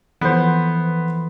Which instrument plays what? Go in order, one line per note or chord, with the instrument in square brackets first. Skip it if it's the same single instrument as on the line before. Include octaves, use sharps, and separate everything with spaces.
[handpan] E3 F3 A4 [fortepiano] B3 C5